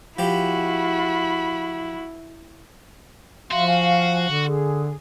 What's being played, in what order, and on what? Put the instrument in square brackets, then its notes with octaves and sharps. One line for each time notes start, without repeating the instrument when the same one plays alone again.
[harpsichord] F3 G4 [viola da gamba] E4 [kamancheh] F#4 B5
[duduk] F3 [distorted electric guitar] F#4 [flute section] E5 F5 C6
[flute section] F5 G#5
[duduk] D3
[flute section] G#4